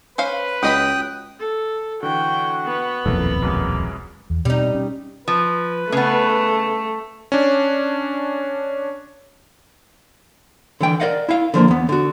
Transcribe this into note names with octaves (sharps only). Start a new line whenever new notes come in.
C#4 B4 C5 F5
C#2 F#3 D#5 G5 B5 D#6 F#6
A4
D3 E3 F#4 G5
B3 B4
D#1 B1 F2 A#3 E4 A4
F#2 B2 G#3 A#3
E2
B2 G3 C4 D#4
C#4
F3 B4
C#3 A3 B3
C#4 D4
D3 E3 G5
A#4 C5 D5 D#5 F5 F#5
E4 F5
D3 F3 A3 A#3
E2 B3
D3 F#4